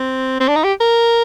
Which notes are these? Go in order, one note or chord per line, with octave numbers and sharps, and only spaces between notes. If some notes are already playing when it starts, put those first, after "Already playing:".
Already playing: C4
C4
D4
D#4
G4
A#4